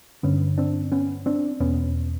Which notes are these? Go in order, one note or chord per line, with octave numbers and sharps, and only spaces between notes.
G2 D3 B3 C#4
C4 D4
B3 C#4
C4 D4
E2 B2 B3 C#4